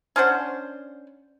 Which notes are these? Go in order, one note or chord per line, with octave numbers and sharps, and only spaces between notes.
C#4 D4 C5 F#5